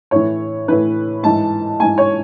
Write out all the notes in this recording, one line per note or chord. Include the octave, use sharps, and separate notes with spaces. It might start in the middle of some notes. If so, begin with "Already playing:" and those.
A2 E3 C#5
A2 E3 B4
G#2 E3 A5
G#2 E3 G#5
C#5